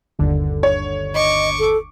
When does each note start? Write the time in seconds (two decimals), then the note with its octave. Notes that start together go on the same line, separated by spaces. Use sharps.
0.19 G1 D#2 D3
0.63 C#5
1.14 D#5 C#6 D6
1.59 A4